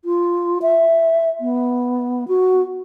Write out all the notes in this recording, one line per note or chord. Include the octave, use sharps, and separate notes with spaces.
F4
E5
B3
F#4